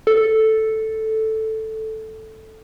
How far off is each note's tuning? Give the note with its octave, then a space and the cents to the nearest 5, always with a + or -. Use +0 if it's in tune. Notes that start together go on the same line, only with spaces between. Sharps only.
A4 +0